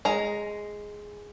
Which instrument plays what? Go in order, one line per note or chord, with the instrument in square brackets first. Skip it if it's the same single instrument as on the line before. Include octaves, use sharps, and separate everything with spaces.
[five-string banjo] G#3 A#5